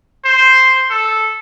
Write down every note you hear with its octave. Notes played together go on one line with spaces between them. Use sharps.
C5
A4